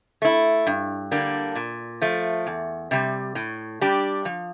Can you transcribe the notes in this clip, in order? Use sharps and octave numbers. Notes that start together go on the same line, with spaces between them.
A3 E4
G2
D3 G3 A#3 D4
A#2
F3 A3
E2
C3 G3
A2
G3 D4 G4
F3